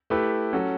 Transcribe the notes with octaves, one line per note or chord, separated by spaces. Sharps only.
A3 E4 G4 B4
F#3 C#4 F#4 A4